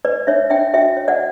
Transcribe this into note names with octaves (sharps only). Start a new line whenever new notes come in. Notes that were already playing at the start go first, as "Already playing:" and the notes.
B4 D5
D4 C#5 E5
D4 E5 G5
F#4 E5 G5
C#5
D5 F#5